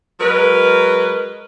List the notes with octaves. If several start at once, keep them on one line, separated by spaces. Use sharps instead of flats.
F#3 G#3 A#4 B4